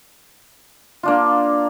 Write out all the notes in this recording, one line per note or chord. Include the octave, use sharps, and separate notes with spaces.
A#3 D4 F4